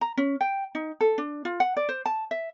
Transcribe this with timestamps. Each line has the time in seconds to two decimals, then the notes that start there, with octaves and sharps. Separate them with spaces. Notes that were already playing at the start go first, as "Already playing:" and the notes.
0.01 A#5
0.17 C#4
0.41 G5
0.75 D#4
1.01 A4
1.18 D4
1.45 F4
1.60 F#5
1.77 D5
1.89 C5
2.06 A5
2.31 E5